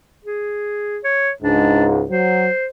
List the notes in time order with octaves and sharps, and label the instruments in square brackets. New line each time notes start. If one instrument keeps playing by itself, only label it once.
[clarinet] G#4
C#5
[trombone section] C#2 G#2 [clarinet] D4
[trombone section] F#3 [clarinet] C5